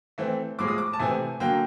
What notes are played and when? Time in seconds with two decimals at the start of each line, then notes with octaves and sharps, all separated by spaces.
0.18 E3 A3 C4
0.59 A2 F3 G#3 D6
0.68 D#6
0.78 D6
0.93 A5
0.99 C3 E3 A3 C4 G#5
1.40 D3 F#3 A#3 G5